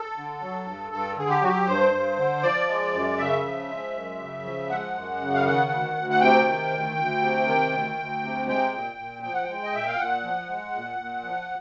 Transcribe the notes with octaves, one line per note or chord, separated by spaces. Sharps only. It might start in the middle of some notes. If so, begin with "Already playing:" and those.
Already playing: A4
D3
F#3
G2
G2 A4
D3 G#4
G4
F#3 F#4
G4
G2 C5
G2
D3
F3 D5
G#3
F#2
C#3 E5
F3
G#3
F#2
C#3
F3
G#3 F#5
F#2
C#3
F5
D#3 F#5
D2
D2
F#5
C3 G5
D#3
D2
D2
C3
D#3
D2
D2
C3
G#3 G5
A#2
A#2
F3 G5
F#5
G#3 G5
D#5
A#2 E5
F5
A#2 F#5
F3
G#3
A#2
A#2
F3